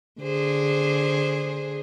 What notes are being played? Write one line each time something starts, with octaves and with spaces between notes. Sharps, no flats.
D3 G#4 C5